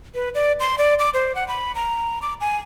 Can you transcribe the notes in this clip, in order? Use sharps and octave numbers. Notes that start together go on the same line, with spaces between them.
B4
D5
C6
D5
D6
C5
F#5
B5
A#5
D6
G#5